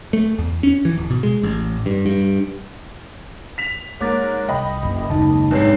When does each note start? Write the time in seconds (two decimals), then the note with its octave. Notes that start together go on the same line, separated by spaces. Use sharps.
0.13 A3
0.39 E2
0.63 C#4
0.85 E3
0.97 D1
1.11 B2
1.23 G#3
1.43 A1
1.86 G2
2.06 G2
3.58 B6 F7
4.00 G#2 A#3 A#4 C#5 D6 A6
4.49 C2 F2 D#5 G5 B5
4.83 F#1 F#2
5.10 F#1 D#2 G#3 D#4 A5
5.51 B1 E2 G#2 C3 D4 B4 C#5 C7